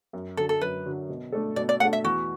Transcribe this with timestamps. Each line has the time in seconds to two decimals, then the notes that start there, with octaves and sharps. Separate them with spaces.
0.13 F#2
0.37 D3 A4
0.40 F#3
0.49 A4
0.61 F#2 B4
0.86 D3 F#3
1.09 B2
1.32 A3 D4 A4
1.56 B2 D5
1.69 D5
1.80 A3 F#5
1.83 D4 A4
1.93 E5
2.04 E2 F#4